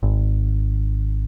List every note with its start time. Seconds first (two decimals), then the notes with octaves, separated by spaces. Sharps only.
0.03 G#1